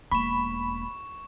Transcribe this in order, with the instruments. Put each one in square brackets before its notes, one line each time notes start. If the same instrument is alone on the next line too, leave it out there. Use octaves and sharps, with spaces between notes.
[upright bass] E1 A#3 [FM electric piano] B5 [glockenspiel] C#6 E7